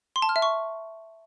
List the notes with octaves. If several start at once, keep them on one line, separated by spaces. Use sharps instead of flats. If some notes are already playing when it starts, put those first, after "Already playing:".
C6
A5
F6
E5
C#6